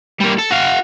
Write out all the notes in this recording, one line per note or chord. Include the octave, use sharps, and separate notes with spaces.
G3 A#3
A4
F#4 F5